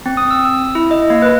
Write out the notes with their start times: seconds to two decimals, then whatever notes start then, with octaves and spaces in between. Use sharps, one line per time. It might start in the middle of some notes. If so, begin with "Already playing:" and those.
0.06 C4
0.17 D#6
0.31 E6
0.45 E6
0.75 E4
0.91 D#5
1.10 A#3
1.22 B4